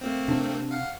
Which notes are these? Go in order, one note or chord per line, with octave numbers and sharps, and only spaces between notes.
A3 A#3 C4
C3 D4
F5 F#5